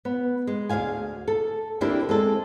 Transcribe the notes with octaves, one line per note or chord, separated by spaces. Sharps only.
B3
G#3
D2 A#2 G#4 F5 G#5
A4
D3 A#3 C4 D4 E4 G4
G#3 C4 A4